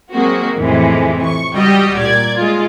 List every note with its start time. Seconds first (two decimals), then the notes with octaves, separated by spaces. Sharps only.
0.11 F#3 G#3 A#3 C4 F#4
0.57 F2 A2 C3 E3 G#3
1.23 C#6
1.53 C#2 G3 F#4 G4 D#5 G5
1.97 A#2 D5 G#6
2.36 G#3 F4